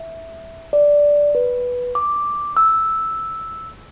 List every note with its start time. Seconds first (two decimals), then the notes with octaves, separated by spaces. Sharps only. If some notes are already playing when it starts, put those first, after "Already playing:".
Already playing: E5
0.73 D5
1.35 B4
1.95 D6
2.57 E6